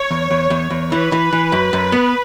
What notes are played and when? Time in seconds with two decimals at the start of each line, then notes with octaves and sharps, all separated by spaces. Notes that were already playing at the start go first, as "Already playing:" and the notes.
Already playing: C#5
0.11 E2
0.30 E2
0.50 E2
0.70 E2
0.92 E3 B4
1.12 E3
1.33 E3
1.52 F#2
1.73 F#2
1.92 B3